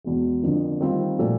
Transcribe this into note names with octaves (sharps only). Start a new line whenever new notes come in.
E2 B2 G#3
F2 D3 F3 A#3
D#3 G3 C4 F4
A#2 F3 A3